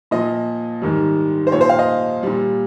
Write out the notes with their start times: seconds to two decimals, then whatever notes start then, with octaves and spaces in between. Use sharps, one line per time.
0.11 A#2 F3 D#5
0.82 G#2 D#3 G3
1.47 C5
1.52 A#2 F3 C#5
1.61 C5
1.69 F5
1.79 D#5
2.23 A#2 G3